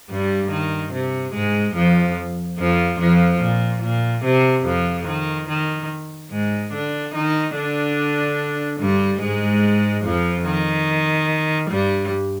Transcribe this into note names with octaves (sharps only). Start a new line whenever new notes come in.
G2 G3
D#3
C3
G#2 G#3
F2 F3
F2 F3
F2 F3
A#2
A#2
C3
F2 F3
D#3
D#3
G#2 G#3
D3 D4
D#3 D#4
D3 D4
G2 G3
G#2 G#3
F2 F3
D#3
G2 G3